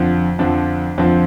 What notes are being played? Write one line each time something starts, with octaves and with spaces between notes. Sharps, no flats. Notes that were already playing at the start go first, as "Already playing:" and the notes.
Already playing: F2 D3 F3
F2 D3 F3 D4
F2 D3 F3 C4